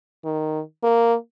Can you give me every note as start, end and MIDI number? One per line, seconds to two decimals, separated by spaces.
0.25 0.60 51
0.83 1.14 58